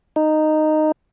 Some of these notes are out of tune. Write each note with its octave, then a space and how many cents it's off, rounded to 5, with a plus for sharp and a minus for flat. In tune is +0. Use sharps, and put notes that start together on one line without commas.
D#4 -10